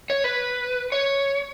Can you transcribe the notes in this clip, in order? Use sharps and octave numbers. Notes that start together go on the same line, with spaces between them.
C#5
B4
C#5